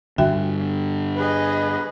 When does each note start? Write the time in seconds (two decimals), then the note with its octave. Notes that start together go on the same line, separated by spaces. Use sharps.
0.18 G2 D3 F#4 E5 G5
1.17 G#4 B4 D#5